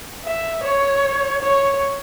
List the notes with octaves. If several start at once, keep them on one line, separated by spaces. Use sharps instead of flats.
E5
C#5
C#5